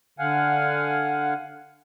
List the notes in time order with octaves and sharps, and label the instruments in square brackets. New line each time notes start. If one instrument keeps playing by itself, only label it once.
[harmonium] D3 F5 F#5 G#5